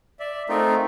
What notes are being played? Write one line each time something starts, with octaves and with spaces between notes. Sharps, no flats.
D5 E5
A3 C4 D#4 F4 A#4